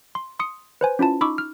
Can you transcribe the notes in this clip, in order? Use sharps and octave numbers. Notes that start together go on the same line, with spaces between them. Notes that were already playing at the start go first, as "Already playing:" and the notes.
C6
C6 D#6 C#7
B4 C5 G#5
C#4 E4 F4 A5
D#4 B5 C#6 D6 E6
F6